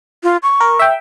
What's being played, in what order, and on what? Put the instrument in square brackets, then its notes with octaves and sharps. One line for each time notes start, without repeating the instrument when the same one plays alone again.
[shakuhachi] F4
C#6
[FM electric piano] A#4
E5 G5